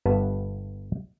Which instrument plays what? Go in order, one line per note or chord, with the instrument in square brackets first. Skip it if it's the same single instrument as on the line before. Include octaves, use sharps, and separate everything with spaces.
[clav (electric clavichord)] G1 G2 B3 B4 A5